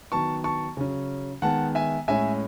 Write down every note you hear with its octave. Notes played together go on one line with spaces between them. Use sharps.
D#3 F#3 B3 A5 C#6
A5 C#6
C#3 F#3 C#4
D#3 G#3 B3 F#5 A5
E5 G#5
A2 G#3 C#4 E5 G#5